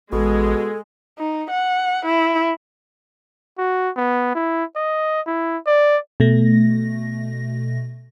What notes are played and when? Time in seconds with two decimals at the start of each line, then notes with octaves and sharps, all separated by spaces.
0.12 A1 B2 G#3 A4
1.19 D#4
1.50 F#5
2.06 E4
3.58 F#4
3.97 B3
4.35 E4
4.76 D#5
5.27 E4
5.67 D5
6.20 B2 A3 A#6